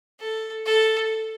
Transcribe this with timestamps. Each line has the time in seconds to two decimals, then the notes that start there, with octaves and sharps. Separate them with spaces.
0.20 A4
0.65 A4